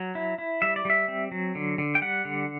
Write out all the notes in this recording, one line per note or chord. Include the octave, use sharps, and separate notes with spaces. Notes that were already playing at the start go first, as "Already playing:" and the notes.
Already playing: F#3
E4
E4
G3 E5
D5
G3 E5
C4
F#3
D3
D3
G5
G3 F#5
D3